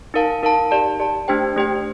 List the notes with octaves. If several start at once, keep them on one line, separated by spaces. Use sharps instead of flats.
D#4 A#4 F5 A5
D#4 A#4 F5 A5
G4 D5 A5
G4 D5 A5
A3 D4 G4 C5 G5
A3 D4 G4 C5 G5